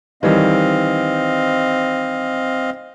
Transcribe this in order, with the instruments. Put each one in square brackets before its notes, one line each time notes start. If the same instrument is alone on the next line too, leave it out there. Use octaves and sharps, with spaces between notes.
[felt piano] D#3 E3 G3 [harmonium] C4 D#5 F5